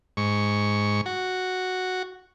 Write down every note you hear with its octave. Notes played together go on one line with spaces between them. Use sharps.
G#2 C#6
F#4